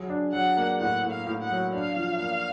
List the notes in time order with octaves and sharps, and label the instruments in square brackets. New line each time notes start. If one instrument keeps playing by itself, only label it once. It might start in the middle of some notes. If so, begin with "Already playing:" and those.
Already playing: [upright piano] F#3 G#4
D4
[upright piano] F#3 [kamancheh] F#5
[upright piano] A#3
[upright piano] A2 [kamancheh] F#5
[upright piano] A2
[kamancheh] F5
[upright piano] A2
[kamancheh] F#5
[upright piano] F#3
[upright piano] D4 [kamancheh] F5
[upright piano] F3
A#3